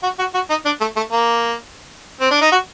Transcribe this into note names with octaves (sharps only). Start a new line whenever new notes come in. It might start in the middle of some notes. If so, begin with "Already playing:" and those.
F#4
F#4
F#4
D#4
D4
A3
A3
A#3
C4
D4
D#4
F#4